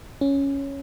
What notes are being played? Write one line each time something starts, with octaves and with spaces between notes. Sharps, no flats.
C#4